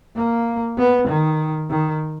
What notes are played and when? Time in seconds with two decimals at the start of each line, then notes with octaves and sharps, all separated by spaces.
0.16 A#3
0.78 B3
1.09 D#3
1.70 D#3